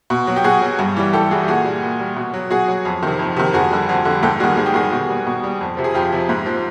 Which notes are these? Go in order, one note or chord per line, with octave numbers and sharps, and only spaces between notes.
B2
F#3
G4
B2 F#4 G#4
F#3
G2
E3 G3
G2 G4 A4
E3 G3 F#4 G#4
G4
A#2 F#4 G#4
G3
A#2
G3
B2
F#3
B2 F#4 G#4
F#3
F2
C3 D#3
F2
C3 D#3
F2 F#4 G#4
D3 G3
F2
D3
G3
G#2 G4 A4
D#3 G3 F#4 G#4
G#2 G#4
G4
D#3 G3 F#4 G#4
B2
G3
B2
G3
F2
C3 F3
G#4
F2 F4 G4
C3 F3
G#2
F3